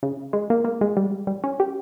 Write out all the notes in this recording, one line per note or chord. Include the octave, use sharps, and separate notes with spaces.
C#3
G#3
A#3
A#3
G#3
G3
G3
C#4
G4